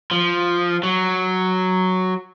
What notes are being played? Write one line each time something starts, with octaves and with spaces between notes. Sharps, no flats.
F3
F#3